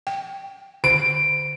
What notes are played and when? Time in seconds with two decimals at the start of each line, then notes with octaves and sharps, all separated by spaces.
0.07 G5
0.84 D3 D7